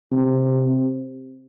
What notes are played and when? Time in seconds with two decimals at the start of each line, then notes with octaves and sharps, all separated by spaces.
0.12 C3